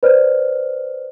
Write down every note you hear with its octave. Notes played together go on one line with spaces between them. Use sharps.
B4 C5 D5 F6